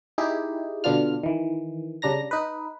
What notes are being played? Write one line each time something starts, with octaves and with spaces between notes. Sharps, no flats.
D#4 E4 G4 G#4
B2 D3 B3 D4 F4 F6
D#3 E3
C#3 G3 D4 A#5 A#6
D#4 B4